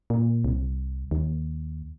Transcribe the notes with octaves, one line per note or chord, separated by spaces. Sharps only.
A#2
C2
D#2